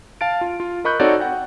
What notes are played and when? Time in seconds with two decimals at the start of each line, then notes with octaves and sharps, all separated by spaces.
0.21 F5 A5 A6 D7
0.41 F4
0.60 F4
0.85 A#4 D#5 B5 C#6 F#6 G6
1.00 C4 D#4 F#4 A4 C#5 D5
1.20 F#5 G5